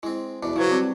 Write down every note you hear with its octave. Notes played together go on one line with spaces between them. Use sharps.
G#3 C4 E4
E2 B2 D4
C#3 F#3 E4 B4 C5
G3 C4